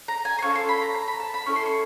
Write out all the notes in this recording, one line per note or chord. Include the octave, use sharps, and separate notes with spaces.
A#5
G#5
C6
C#4 F4 A4 C#6
C6
B5
A#5
A#5
B5
A5
B5
C#4 E4 A4 C#6
C6
C#6